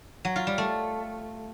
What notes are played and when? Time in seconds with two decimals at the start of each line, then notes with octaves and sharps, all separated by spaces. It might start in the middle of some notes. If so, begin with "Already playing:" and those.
0.25 F#3
0.36 F4
0.47 G3
0.58 A3